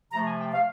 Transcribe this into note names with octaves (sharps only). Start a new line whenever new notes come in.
C3 F3 A3 A#5
G#5
G5
F5